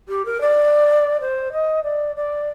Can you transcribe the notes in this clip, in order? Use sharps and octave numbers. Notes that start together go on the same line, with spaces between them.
G4
A#4
D5
C5
D#5
D5
D5